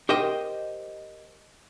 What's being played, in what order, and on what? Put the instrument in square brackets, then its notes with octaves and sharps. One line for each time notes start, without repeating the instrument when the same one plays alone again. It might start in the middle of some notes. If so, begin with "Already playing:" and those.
[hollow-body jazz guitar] G4 A#4 C5 D#5 G5